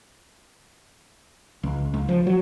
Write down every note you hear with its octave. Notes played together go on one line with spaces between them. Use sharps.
C#2
C#2
F3
F#3